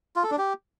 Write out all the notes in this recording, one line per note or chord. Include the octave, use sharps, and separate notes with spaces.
F4
A4
D4
G4